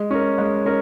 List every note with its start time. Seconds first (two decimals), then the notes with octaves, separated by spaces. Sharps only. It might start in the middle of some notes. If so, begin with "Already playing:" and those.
Already playing: G#3
0.10 C#4 A#4
0.38 G#3
0.65 C#4 A#4